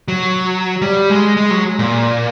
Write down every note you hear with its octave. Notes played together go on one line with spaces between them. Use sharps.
F#3
G3
G#3
G#3
F#3
A#2